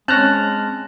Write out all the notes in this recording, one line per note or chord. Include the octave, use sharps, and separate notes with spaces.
G#3 C4 C#4 A5 F6 F#6 A#6